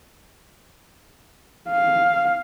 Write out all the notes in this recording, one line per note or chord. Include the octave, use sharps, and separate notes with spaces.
F5